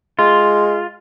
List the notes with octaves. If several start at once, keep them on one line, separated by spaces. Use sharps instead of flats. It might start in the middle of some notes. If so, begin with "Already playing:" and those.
G#3 F4